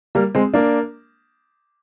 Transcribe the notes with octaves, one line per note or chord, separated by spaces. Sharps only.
G3 A#3
G#3 C4
A#3 D4